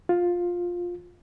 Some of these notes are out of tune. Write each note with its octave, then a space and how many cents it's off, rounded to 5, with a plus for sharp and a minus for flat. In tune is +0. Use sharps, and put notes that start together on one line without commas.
F4 +10